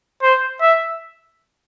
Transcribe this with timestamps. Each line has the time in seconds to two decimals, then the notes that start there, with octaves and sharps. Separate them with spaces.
0.23 C5
0.61 E5